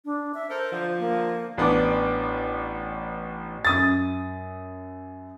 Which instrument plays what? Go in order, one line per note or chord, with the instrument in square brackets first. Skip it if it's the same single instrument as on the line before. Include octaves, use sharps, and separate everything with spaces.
[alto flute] D4
E5
[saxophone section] A4 A#4 [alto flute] C5
[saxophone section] D3 F3
[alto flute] A#3
[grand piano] A1 B3 D4 D6
[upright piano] F#2 D#6 A6